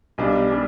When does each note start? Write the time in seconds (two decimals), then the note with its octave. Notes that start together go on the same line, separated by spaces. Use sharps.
0.18 B1 B2 G3 D4
0.50 G3 D4